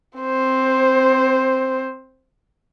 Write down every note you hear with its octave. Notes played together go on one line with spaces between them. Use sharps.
C4 C5